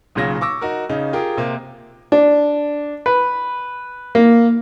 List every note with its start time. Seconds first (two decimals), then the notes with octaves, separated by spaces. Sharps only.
0.15 B1 A#2 C#3 F#3 A#6
0.41 C#6 D6 E6 A#6
0.61 D#4 F#4 A#4
0.89 C#3 C#4 D#4
1.13 F4 G4 G#4 A#4
1.37 C3 A#3
2.12 D4
3.06 B4
4.15 A#3